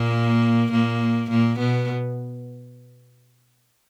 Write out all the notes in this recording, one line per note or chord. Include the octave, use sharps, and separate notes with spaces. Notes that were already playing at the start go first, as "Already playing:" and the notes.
Already playing: A#2 A#3
A#2 A#3
A#2 A#3
B2 B3